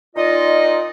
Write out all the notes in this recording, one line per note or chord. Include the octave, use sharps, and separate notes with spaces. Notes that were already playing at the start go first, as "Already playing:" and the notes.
A#2 D#4 F4 D5 D#5